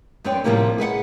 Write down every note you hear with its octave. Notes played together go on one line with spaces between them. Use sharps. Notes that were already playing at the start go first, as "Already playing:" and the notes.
F#2 B3 C4 C#5 D5 G5
A2 C3 D#3 F3 G3 A#3
G#4 B4 D5 F#5